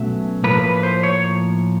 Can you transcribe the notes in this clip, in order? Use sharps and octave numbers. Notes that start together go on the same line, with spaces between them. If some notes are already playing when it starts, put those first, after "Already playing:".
Already playing: B2 F#3 A3 C#4 E5
A2 F3 A#3 B4
B4
C5
C#5